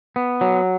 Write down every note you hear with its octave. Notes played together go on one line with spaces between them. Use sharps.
B3
F#3